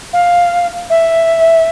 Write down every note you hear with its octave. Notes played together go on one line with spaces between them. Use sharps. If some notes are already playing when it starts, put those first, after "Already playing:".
F5
E5